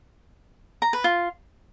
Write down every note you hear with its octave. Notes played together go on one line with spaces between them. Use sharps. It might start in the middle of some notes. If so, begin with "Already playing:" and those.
A#5
B4
F4